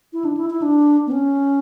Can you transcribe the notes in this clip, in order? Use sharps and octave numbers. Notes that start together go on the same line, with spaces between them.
E4
D4
E4
E4
D4
B3
C#4